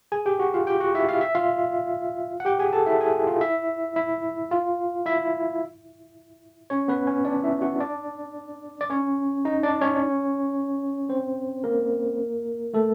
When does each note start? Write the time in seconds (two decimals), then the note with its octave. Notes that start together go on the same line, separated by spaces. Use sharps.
0.12 G#4 G#5
0.26 G4 G5
0.39 F#4 F#5
0.54 F4 F5
0.67 G4 G5
0.80 F#4 F#5
0.95 E4 E5
1.09 F5
1.21 E5
1.35 F4 F5
2.40 F#5
2.45 G4 G5
2.59 G#4 G#5
2.73 A4 A5
2.86 E4 E5
3.00 G#4 G#5
3.27 F4 F5
3.41 E4 E5
3.96 E4 E5
4.51 F4 F5
5.06 E4 E5
6.70 C#4 C#5
6.88 B3 B4
7.07 C#4 C#5
7.25 D4 D5
7.43 E4 E5
7.62 F#4 F#5
7.80 D4 D5
8.81 D5
8.90 C#4 C#5
9.45 D#4 D#5
9.63 D4 D5
9.81 C#4 C#5
11.09 C4 C5
11.64 A#3 A#4
12.74 A3 A4